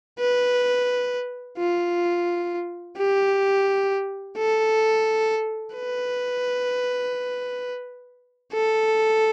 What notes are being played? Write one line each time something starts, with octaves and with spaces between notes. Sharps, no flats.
B4
F4
G4
A4
B4
A4